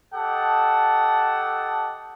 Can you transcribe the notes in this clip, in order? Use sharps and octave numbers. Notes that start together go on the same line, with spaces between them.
G4 A4 D#5 F#5 A5